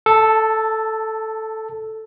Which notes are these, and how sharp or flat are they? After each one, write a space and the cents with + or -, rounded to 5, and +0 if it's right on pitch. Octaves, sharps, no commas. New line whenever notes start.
A4 +0 A5 +25